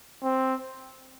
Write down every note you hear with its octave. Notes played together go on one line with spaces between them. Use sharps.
C4